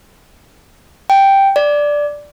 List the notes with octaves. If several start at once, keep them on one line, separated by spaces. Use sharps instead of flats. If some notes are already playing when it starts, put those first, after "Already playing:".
G5
D5